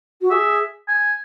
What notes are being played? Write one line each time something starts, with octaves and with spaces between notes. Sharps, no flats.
F#4
G#4 E5
G#5